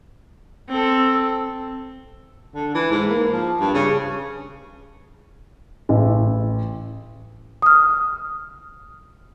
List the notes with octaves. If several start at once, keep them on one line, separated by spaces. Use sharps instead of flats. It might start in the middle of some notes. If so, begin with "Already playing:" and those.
C4 A4
D3
E3
G#2
A#3
F3
G2
C#3
A1
D#6 F6